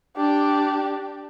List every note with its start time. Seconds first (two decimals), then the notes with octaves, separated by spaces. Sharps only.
0.17 D4 G4